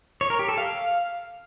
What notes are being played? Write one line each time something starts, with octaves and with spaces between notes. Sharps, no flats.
C#5
A#4
G4
A4
F5